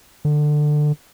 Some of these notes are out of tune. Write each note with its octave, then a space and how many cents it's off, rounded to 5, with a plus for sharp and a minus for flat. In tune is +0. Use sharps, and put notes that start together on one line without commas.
D3 +20